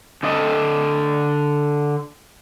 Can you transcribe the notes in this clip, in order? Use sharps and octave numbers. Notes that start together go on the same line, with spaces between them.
D3 A4 D#5